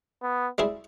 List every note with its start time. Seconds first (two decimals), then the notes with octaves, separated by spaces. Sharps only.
0.22 B3
0.58 G3 C4 E4 G#4